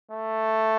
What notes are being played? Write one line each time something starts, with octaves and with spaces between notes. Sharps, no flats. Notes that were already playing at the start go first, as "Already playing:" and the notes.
A3